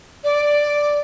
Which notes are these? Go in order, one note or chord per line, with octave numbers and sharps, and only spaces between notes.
D5